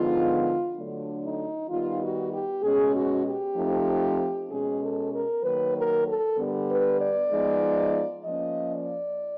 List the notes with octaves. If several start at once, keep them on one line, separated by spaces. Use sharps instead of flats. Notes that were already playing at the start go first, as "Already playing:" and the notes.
Already playing: D3 F3 G#3 B3 D#4 F4
D3 F#3 A3 D4
D#4
D#3 G3 B3 D#4 F4
F#4
G4
B2 G#3 C#4 G#4
F#4
G4
F3 A3 C4 D#4
B2 G#3 C#4 G#4
A4
A#4
D#3 F#3 A#3 B4
A#4
A4
D3 G3 B3
B4
D5
F3 G#3 B3 D#4
F3 A#3 C#4 D#5
D5